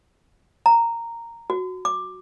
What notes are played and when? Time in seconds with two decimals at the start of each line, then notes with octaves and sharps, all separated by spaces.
0.66 A#5
1.50 F#4
1.85 D6